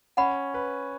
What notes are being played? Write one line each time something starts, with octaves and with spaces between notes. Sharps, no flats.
C#4 F#5 B5
B4